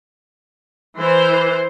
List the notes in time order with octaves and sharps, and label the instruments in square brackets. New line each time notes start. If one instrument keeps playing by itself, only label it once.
[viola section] E3 C5